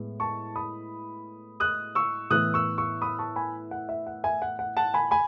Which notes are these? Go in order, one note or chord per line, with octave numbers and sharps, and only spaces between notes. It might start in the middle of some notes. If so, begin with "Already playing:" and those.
Already playing: A2 G#3 B3
A5 C#6
B5 D#6
D#6 F#6
C#6 E6
A2 E3 B3 D#6 F#6
C#6 E6
C#6 E6
B5 D#6
A5 C#6
G#5 B5
F#5
E5
F#5
E5 G#5
F#5
F#5
F#5 A5
G#5 B5
G#5 B5